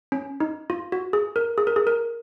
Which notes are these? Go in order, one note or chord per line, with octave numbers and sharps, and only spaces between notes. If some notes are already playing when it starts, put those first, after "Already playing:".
C#4
D#4
F4
F#4
G#4
A#4
G#4
A#4
G#4
A#4